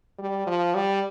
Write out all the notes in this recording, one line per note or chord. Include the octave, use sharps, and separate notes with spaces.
G3
F3
G3